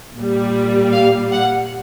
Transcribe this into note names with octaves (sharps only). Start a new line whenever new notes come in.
A#2 G3
F5
F#5